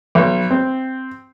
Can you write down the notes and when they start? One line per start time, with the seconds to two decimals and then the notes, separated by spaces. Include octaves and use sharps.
0.15 B1
0.50 C4